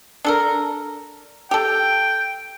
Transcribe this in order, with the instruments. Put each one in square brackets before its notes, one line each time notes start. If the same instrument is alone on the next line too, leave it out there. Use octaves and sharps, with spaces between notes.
[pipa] D4 A4 A#4
[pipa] G4 A4 [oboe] G5